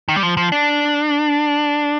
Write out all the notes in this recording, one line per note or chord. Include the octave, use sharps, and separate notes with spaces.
D#3
G3
F3
F3
D4